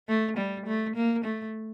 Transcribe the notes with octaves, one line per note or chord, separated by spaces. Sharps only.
A3
G3
A3
A#3
A3